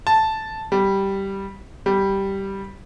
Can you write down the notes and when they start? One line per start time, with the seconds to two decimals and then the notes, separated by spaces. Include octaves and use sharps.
0.07 A5
0.72 G3
1.86 G3